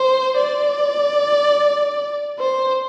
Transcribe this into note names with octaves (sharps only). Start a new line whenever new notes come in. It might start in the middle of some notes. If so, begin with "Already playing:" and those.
Already playing: C5
D5
C5